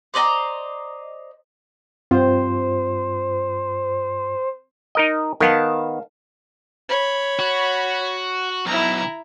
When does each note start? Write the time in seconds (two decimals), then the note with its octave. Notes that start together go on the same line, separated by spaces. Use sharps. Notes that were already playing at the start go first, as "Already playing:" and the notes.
0.14 C5 D5 D#5 A#5
2.11 G2 C4 F4 C5
4.95 D#4 A#4 D#5
5.40 D#3 B3 A#4 F5 A5
6.89 C#5 B5
7.39 F#4
8.66 B1 E4 A#5